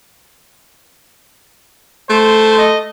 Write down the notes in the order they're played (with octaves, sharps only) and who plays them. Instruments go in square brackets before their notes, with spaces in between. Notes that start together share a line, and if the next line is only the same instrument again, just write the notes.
[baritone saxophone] A3 [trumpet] C5
[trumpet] D#5